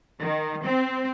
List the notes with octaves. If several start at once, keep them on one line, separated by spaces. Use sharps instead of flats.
D#3
C4